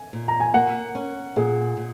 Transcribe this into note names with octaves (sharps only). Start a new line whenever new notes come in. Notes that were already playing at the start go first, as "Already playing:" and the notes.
Already playing: G#5
A#2
A#5
G#5
A#3 F#5
C#4
A#2 G#4
A#2